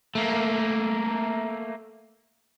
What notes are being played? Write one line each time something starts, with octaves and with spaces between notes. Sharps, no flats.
A3 A#3